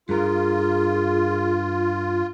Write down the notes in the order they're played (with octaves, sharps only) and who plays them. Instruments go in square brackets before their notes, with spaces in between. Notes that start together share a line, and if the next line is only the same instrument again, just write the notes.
[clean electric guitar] G2 A#4 [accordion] F4 [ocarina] G#4